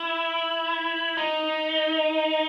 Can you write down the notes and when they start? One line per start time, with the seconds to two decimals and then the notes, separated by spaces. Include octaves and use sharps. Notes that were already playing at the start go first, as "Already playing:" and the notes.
Already playing: E4
1.17 D#4